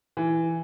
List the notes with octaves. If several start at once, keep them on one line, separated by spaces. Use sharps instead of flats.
E3